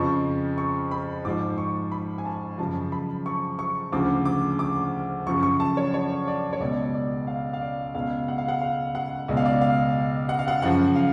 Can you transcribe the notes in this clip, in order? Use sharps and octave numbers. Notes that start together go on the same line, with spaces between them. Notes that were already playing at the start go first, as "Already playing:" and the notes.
Already playing: F2 C#3 F3 C#6
C#6
B5
G#2 F3 D6
C#6
B5
G#5
A5
F#2 C#3 F3 A5
B5
C#6
C#6
D2 C#3 F3 D6
D6
D6
F#2 C#3 F3 C#6
C#6
A5
C#5
C#5
D5
C#5
C#2 B2 D5
D5
F5
F5
D5
C#2 B2 F5
F#5
F5
F#5
F5
F#5
C#2 B2 D5
F5
D5
F5
F#5
F5
F#5
F#2 C#3 F3 F#5
F5